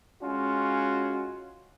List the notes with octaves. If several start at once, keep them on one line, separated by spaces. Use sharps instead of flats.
G#3 C#4 F4 F#4